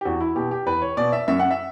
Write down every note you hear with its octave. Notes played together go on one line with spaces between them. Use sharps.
G4
E2 F#4
E4
B2 G4
G4
E2 B4
C#5
B2 D5
E5
F#2 E5
F#5
E5